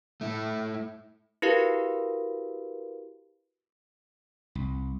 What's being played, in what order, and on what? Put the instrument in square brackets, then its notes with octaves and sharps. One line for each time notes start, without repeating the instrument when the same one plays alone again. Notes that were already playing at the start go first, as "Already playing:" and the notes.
[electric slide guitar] A3 E4
[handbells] E4 F#4 G4 A#4 B4 F5
[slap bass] C2